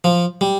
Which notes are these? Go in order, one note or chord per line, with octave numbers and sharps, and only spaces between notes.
F3
G3